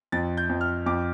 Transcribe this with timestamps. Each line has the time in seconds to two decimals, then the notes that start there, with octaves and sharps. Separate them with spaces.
0.12 F2 A6
0.37 G6
0.49 F2
0.61 F6
0.86 F2 D6